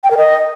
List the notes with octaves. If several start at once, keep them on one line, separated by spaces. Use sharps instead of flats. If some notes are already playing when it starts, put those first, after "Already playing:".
G5
A#4
D#5